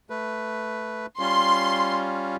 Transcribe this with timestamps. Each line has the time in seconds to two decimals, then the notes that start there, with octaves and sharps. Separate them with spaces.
0.10 A3 B4
1.19 G3 C#4 F4 C6